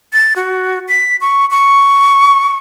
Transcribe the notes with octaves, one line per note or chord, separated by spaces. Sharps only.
A6
F#4
B6
C#6
C#6